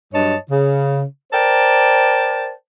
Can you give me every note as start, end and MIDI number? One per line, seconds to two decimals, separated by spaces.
0.13 0.36 43
0.13 0.36 54
0.13 0.36 73
0.13 0.36 75
0.13 0.36 81
0.50 1.02 49
1.33 2.51 70
1.33 2.51 72
1.33 2.51 74
1.33 2.51 79
1.33 2.51 81